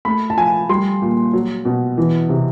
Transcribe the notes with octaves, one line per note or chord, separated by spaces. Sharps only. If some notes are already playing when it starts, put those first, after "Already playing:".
A3 B5
A5
F3 G#5
G3 C6
A#2
F#3
B2
E3
C3